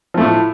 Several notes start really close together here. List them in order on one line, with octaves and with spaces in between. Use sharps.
F3 A3 A2